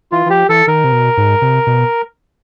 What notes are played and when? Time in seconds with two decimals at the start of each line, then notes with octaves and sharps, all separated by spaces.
0.12 E3 F4
0.26 E3
0.30 F3 G4
0.49 E3 A4
0.67 D#3 A#4
0.84 C3
0.92 B2
1.17 G#2
1.42 C3
1.67 B2